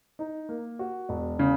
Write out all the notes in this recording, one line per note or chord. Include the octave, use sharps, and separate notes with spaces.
D#4
A#3
F#4
E1
C#3